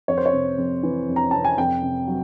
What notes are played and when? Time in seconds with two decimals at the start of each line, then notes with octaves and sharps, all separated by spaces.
0.08 F2 C#5
0.18 C5
0.26 C#5
0.33 C3
0.58 F2
0.83 E3
1.08 F2
1.16 A#5
1.31 C3 A5
1.45 G#5
1.58 F2 G5
1.83 C3
2.08 F#3